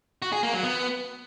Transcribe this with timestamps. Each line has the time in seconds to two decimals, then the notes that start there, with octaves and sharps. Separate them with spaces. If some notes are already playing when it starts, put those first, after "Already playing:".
0.22 F#4
0.33 G#4
0.43 A#3
0.53 F#3
0.64 B3